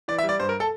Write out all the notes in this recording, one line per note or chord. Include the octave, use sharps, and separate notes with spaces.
E3 D5
E5
G3
D5
G2 C5
A#4
A4